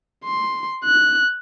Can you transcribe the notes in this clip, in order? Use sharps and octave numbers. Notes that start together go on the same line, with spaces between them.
C6
F#6